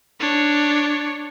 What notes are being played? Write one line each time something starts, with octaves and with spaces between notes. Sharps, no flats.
D4 C#5